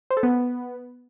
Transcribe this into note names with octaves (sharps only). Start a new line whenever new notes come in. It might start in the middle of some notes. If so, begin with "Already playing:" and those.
C5
A4
B3